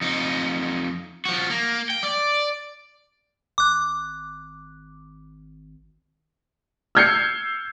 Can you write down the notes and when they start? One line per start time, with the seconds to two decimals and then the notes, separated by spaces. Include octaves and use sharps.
0.01 F2 D#4
1.25 F3 F#4
1.50 A#3
1.90 G5
2.03 D5
3.58 G#1 D6 F#6
6.95 E6 F6 G6 G#6 C7 C#7